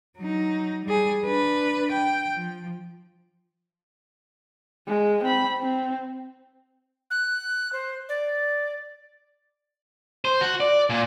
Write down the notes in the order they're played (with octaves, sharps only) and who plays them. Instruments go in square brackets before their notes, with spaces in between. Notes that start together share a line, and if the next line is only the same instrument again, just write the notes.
[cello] F#3 D#4
G3 G#4
D4 B4
G5
F3
[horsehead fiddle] G#3
C4 B5
C4
[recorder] F#6
C5
D5
[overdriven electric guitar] C5
F#4
D5
A#2